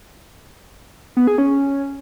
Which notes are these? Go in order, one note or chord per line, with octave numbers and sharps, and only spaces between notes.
B3
G#4
C#4